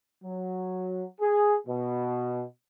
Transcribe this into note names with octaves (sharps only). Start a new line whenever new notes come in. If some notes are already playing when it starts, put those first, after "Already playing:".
F#3
G#4
B2